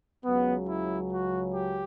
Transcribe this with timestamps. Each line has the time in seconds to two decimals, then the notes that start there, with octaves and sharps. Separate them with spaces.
0.25 C#2 C#3 F#3 B3
0.68 E4
1.11 F#4
1.53 G4